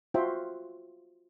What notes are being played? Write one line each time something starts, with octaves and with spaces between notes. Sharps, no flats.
F4 F#4 C5 E5 G5